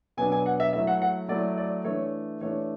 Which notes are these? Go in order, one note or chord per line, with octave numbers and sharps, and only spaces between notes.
B2 F#3 B3 D4 G#5
G#5
F#5
E5
F#3 A3 E4 E5
F#5
F#5
F#3 A3 E4 D5
D5
E3 A3 D4 C#5
E3 A3 D4 C#5